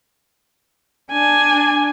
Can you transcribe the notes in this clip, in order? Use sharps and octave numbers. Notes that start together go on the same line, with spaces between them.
D4 G#5